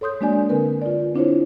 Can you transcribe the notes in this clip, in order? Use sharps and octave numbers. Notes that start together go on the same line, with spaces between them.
A4 C#5 C6 D#6 G6
G#3 A#3 D4 F#4 D5 G#5
D3 C4 A#4 B4
F4 D5
C4 D4 E4 F4 C5 C#5